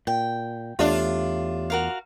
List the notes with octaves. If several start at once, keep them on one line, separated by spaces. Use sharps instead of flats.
A#2 G5
E2 A3 D4 F4 G4 C#5 E5
F#4 A#4 F5